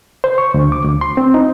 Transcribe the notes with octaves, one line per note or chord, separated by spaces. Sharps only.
C5
C#6
D2
D6
D2
C6
C4
D#4